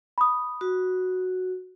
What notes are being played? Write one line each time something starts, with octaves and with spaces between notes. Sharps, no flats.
B5 D#6
F#4